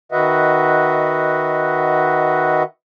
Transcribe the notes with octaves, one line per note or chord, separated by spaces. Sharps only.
D#3 F#4 B4 D#5 E5 F#5